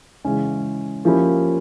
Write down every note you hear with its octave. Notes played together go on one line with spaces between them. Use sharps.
C#3 E3 G#3 C#4
F3 A#3 C#4 E4 G4